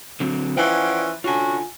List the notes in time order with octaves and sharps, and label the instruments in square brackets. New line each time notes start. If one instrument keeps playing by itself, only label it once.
[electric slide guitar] D3 F#3 C4
[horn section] E3 F3 C#4 [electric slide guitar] D5 F#5 G5
[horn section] D3 C#4 F#4 [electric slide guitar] F4 G#5